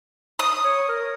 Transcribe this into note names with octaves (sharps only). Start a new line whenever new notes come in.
D#6
C#5
A#4